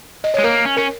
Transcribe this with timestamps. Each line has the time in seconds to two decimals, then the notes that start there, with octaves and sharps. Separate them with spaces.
0.24 D#5
0.34 G#3 C#5
0.44 A#3 A#4
0.65 C#4
0.77 C#4 A#4